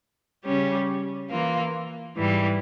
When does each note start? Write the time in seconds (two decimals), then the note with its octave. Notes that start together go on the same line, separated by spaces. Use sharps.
0.44 C#3 G3 C#4 G4
1.30 E3 A#3 F4
2.15 G#2 E3 G3